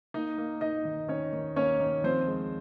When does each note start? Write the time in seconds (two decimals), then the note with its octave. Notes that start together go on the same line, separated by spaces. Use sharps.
0.14 A#3 D#4 D#5
0.38 A#3
0.61 A#3 D#4 D#5
0.85 D#3
1.08 D#3 C#4 C#5
1.33 D#3
1.56 A#3 C#4 C#5
1.80 D#3
2.04 F3 C4 C5
2.27 G#3